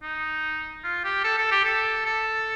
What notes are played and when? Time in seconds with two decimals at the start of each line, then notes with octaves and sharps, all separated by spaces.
0.03 D#4
0.84 F4
1.04 G4
1.24 A4
1.38 A4
1.51 G4
1.65 A4
2.05 A4